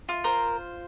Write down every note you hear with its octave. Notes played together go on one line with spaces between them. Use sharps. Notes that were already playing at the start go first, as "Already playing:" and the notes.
F4
A#4 C5